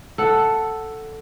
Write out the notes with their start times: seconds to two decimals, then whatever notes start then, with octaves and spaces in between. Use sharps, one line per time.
0.18 A4 F#5